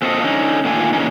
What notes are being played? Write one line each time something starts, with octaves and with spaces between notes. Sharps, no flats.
A#2 C4 F4 A4 B4 D#5
D3 C#4 D#4
A#2 D3 D#3 A3 F4 G#5
A#2 C#3 E3 C#4 D#4